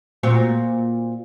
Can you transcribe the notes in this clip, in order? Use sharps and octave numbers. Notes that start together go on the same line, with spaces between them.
A#2 C4 F#4